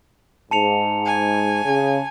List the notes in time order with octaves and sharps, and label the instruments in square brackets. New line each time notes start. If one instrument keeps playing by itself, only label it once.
[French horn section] G#2 [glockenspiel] A5 C#7 F7
[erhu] G#5
[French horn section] C#3